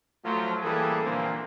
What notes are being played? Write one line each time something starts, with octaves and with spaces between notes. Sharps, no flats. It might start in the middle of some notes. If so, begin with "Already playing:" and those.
F3 F#3 A3
A1 E3 G3 A#3 G#4 A4
A#2 D3 E3 F3 A#3 C4